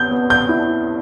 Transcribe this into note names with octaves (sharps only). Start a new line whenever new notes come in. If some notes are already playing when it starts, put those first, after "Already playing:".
Already playing: B3 G6
B3
G6
E4